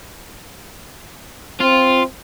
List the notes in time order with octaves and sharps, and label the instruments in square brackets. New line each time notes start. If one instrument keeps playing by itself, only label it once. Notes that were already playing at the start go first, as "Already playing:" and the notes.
[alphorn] C4 [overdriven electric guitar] F4